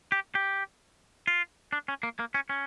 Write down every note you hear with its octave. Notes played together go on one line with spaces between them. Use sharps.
G4
G4
F4
D4
C#4
A#3
A#3
C#4
C#4